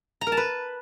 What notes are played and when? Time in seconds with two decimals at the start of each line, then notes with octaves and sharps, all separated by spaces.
0.21 A#5
0.27 A#4
0.32 A5
0.37 B4